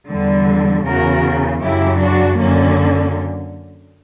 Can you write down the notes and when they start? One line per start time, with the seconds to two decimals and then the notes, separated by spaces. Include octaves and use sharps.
0.10 E2 D3 G3
0.86 E2 C#3 E3 F#4 A#4
1.62 F#2 C#3 F#3 E4 G4
2.00 D4 F#4
2.39 F#2 D3 F#3 A#3 C#4